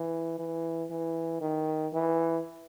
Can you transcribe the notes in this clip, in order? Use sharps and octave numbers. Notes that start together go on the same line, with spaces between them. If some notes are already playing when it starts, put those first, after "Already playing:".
Already playing: E3
E3
E3
D#3
E3